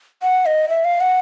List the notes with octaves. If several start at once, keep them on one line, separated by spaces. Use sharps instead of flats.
F#5
D#5
E5
F5
F#5